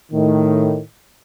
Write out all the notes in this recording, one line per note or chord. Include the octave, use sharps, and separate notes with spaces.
A2 D#3